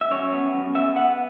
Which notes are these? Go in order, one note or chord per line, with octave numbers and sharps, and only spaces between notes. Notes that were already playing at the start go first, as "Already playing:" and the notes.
E5
F#2 C#5
B3
F#2
B3 E5
B3 F#5